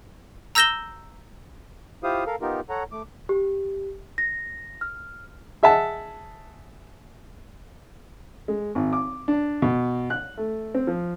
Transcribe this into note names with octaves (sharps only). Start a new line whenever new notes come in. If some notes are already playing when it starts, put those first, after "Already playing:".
A#5 E6 G6 A#6 E7 G7
E4 F4 G4 C5 F5 D#6
A4 A#4 F5
B3 D#4 F4 G4 A#4
A4 C#5 F#5 A#5
A3 D6
G4
A#6
F6
G#4 E5 F#5 A5
G#3
G#1
D6
D4
B2
F#6
A3
C4
F3